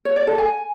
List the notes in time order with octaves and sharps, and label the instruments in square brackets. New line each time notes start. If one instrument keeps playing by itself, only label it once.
[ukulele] C#5
D5
A4
G#5